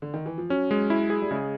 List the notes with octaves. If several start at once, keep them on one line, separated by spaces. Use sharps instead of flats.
D3
D#3
E3
F3
F#3 C#4
G#3
E4
G#4
G3
C#3 G#3